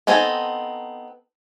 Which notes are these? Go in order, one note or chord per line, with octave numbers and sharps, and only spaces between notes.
B3 C4 D#4 A4 G#5